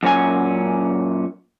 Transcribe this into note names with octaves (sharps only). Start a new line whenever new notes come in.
F#2 A#2 C#4 G#5